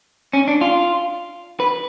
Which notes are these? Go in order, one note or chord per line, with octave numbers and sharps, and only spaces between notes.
C#4
D4
F4
B4